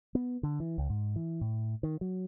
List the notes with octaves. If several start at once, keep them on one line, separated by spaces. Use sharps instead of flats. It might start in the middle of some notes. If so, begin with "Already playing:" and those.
B3
D3
E3
C#2
G#2
E3
A2
D#3
F#3